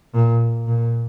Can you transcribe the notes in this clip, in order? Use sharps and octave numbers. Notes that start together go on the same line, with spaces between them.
A#2
A#2